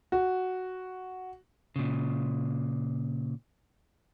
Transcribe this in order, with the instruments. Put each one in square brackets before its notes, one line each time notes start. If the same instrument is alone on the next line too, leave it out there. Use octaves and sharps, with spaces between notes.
[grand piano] F#4
[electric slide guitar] A#2 C#3